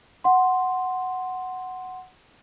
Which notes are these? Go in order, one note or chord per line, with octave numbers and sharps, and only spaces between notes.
F#5 C6